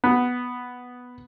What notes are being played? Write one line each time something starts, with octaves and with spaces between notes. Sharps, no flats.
B3